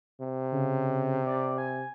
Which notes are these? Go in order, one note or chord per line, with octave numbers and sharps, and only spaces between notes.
C3
C#3
D5
G#5